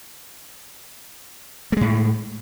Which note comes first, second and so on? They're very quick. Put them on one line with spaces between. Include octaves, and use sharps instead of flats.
A3 G#3 A2